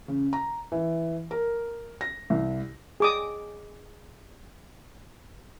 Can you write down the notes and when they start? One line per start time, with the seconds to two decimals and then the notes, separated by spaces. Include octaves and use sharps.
0.08 C#3
0.33 A#5
0.72 E3
1.31 A#4
2.01 A#6
2.30 C2
3.00 G#4 D6 D#6